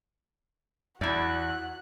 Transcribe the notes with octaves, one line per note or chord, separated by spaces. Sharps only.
E2 E4 F#4 D5 F#6